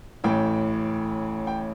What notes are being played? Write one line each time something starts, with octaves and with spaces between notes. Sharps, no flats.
A1 A2 E3 G5
G5